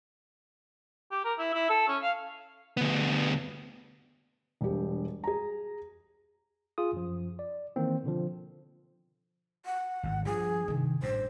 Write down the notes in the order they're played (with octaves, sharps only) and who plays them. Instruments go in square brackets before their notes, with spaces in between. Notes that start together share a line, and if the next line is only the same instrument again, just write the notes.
[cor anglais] G4
A#4
E4
E4
A4
C#4
F5
[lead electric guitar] D2 B3
[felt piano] E1 G2 G4
G#4 A#5
[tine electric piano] F4 G#4 D#6
F#2 F3
D5
D#3 E3 A#3 C4
B2 D3 F3
[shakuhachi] F#5
[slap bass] G#1 G2
[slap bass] G2 [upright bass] F3 [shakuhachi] G#4
[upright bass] C3 D#3
[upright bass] A1 [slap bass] G2 [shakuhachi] C5